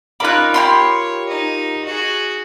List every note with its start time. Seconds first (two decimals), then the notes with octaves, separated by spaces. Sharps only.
0.20 C#4 D#4 F4 A#4 B5 D6 F#6
0.54 G4 C#5 B5 C6
1.29 D#4 D#5
1.85 F#4 G#4